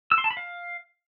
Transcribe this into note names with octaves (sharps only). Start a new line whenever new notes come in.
E6
C6
A5
B5
F5